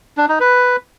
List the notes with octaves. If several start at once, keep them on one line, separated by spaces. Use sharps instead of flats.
D4
D#4
B4